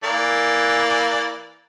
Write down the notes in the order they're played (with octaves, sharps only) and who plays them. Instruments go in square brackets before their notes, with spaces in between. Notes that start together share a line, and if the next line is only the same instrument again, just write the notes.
[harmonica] E3 A#3 D5